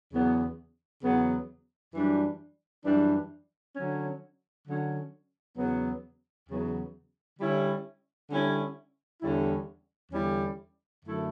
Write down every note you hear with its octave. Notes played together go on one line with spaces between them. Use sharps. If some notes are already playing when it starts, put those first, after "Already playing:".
E2 C#3 F#3 B3
E2 C#3 F#3 B3
F#2 E3 G3 D4
F#2 E3 G3 D4
D3 F#3 C#4
D3 F#3 C#4
E2 C#3 F#3 B3
E2 C#3 F#3 B3
D3 G3 C#4 E4
D3 G3 C#4 E4
E2 D3 G3 C#4 E4
E2 D3 G3 C#4 E4
F#2 D3 A3 E4